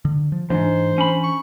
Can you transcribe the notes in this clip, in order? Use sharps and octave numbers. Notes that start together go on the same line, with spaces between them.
D3
F3
E2 G#2 E3 D4 C5
C#4 B5
C#6